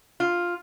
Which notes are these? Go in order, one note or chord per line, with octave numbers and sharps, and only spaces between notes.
F4